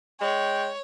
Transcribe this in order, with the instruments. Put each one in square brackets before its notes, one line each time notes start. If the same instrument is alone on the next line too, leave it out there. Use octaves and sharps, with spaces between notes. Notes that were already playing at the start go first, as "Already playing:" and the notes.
[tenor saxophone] G#3 [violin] C#5 [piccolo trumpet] G5